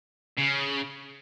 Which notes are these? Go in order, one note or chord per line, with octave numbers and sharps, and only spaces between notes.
C#3